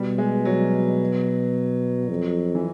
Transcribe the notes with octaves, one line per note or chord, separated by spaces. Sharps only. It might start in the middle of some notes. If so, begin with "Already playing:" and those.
Already playing: B2 G3
G#3
F#3
F2
E3